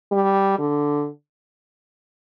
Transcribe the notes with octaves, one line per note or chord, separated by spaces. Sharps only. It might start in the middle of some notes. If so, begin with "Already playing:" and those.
G3
D3